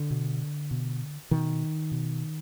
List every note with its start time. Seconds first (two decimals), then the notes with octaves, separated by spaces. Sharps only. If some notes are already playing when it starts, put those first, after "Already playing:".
Already playing: D3
0.11 B2
0.71 B2
1.31 B2 D#3
1.92 B2